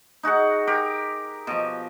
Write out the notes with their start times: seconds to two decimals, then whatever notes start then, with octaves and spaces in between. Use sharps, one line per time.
0.23 D#4 F#4 G#4 F#5
0.67 G4 A#4
1.47 B2 F3